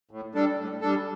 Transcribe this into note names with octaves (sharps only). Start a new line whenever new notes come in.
A2
G3 D4 A4
A2
G3 D4 A4